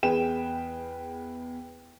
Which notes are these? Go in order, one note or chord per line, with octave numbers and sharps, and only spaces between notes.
E2 G#4 B4 G5 E7